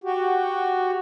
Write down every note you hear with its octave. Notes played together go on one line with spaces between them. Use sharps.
F#4 G4